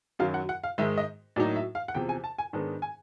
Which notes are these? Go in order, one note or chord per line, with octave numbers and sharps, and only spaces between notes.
F#2 D#3 F#3 F5
F#5
F#5
F5
G#2 D#3 G#3 E5
D#5
A2 F#3 A#3 D#4 D5
E5
F5
F#5
E2 C3 F3 G5
G#5
A5
G#5
G#2 D#3 G#3 B3 D4
G#5